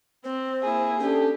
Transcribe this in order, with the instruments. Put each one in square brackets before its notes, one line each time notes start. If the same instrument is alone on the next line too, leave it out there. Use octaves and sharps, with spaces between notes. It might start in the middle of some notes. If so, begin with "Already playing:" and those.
[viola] C4 [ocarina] C5
[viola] A#3 E4 [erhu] G#4
[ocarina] C#4 [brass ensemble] D4 A4 [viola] G4